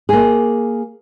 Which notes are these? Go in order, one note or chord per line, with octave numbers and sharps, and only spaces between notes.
A#3 G#4